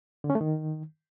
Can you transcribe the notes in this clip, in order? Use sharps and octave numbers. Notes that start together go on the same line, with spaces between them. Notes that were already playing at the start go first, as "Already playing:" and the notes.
D3
C#4
A3
D#3